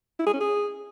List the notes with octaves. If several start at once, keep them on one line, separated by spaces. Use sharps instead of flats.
E4
G#4
C#4
G#4